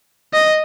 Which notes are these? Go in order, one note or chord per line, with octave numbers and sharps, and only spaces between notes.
D#5